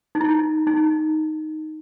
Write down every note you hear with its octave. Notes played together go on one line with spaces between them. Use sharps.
D#4
E4
D#4